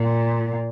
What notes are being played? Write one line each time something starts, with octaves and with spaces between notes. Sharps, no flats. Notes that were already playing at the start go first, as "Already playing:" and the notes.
Already playing: A#2